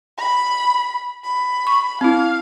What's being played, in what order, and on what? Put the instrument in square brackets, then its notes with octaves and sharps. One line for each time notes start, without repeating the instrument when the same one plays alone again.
[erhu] B5
B5
[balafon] C#6
[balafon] C4 E4 [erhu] F5